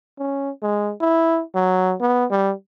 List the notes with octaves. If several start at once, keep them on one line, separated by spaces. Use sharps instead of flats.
C#4
G#3
E4
F#3
B3
G3